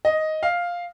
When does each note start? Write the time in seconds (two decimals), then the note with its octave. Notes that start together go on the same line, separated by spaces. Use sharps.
0.05 D#5
0.43 F5